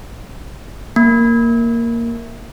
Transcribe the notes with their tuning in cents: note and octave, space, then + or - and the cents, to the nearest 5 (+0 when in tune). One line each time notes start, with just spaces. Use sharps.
A#3 -5